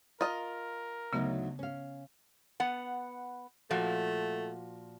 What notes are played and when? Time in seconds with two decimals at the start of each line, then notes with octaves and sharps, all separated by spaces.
0.21 F4 A#4 D#5 A#5
1.13 D2 C#3 F#3 B3 D#4
1.59 C#4 F5
2.60 B3 F#5
3.71 A#2 F3 A3 F#4